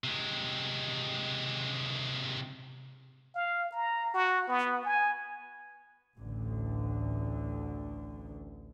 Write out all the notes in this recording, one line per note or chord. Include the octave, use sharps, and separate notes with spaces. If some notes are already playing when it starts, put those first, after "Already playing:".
C3 G#3
F5
A#5
F#4
B3
G#5
A1 D2 D3